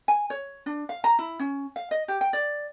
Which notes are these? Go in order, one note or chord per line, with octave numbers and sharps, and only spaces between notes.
G#5
C#5
D4
F5
A#5
E4
C#4
F5
D#5
G4
G5
D5